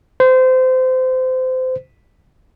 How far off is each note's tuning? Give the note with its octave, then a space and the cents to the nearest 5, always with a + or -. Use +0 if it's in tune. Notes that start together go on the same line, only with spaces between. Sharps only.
C5 -25